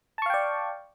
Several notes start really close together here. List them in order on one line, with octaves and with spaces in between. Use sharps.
A5 C#6 F5 G5 D5